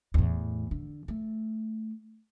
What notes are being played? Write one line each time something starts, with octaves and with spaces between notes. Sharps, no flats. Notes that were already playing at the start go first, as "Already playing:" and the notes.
E2 A2
D3
A3